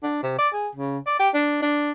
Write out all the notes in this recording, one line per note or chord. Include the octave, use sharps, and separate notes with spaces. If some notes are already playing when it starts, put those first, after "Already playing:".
D4
C3
D5
G#4
C#3
D5
G4
D4
D4